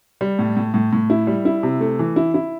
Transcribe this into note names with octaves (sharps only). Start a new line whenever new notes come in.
G3
A2
A2
A2
A2
E4
G3
E4
C3
A3
E3
E4
E4